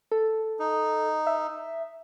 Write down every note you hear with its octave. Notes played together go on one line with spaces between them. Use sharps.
A4
D#4
E5